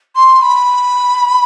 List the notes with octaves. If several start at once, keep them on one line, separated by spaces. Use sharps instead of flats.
C6
B5